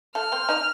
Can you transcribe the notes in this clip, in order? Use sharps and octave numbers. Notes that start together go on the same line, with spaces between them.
A3 A4 F6
C4 C5
D#4 D#5